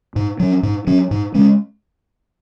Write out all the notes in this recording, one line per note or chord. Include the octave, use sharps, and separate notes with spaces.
G#2
F#3 C#4
G#2
F#3 C#4
G#2
G#3 C#4